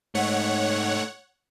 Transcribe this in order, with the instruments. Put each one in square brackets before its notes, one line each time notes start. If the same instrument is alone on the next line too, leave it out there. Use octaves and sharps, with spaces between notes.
[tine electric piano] G#2 [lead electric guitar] A3 D#4 [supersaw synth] C#5 F#5